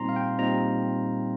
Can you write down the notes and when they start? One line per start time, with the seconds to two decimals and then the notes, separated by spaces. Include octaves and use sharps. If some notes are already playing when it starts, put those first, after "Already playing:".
Already playing: A#2 G3 C4 D#4 A#5 C6
0.09 F5
0.16 G5
0.38 A#2 G3 C4 D#4 A#5